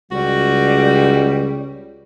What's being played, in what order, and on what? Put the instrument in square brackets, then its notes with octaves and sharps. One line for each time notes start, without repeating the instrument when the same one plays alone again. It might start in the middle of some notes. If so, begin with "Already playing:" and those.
[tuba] C#2 [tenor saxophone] G3 [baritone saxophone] F#4